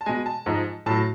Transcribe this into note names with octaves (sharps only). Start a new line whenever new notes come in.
A5
B2 G#3 G#5
A5
G#2 F3 G#3
A2 F#3 A5